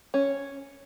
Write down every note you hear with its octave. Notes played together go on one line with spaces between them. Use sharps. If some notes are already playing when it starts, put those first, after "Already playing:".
C#4